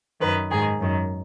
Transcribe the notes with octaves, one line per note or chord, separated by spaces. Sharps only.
F#2 D#3 B4
G#2 D#3 G#4
F#2 D#3